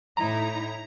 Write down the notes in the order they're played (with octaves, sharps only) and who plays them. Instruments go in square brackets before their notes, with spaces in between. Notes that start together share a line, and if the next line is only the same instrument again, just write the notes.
[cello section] A2 D#4 E4 [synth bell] A#5